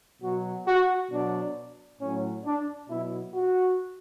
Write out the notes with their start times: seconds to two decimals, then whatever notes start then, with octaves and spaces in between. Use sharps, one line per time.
0.21 B2 F#3 F#4
0.67 F#4
1.10 B2 F#3 D4
2.00 A2 F#3 C#4
2.45 D4
2.88 B2 F#3 E4
3.34 F#4